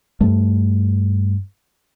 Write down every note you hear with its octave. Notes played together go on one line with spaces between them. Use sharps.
G2 A3